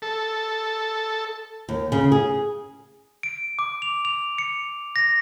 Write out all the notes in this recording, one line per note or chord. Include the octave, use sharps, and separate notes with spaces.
A4
D#2
C#3
G#4
D7
D6
F7
F7
C#7
A#6